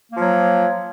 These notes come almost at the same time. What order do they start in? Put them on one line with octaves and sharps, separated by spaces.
A#3 F3 F#3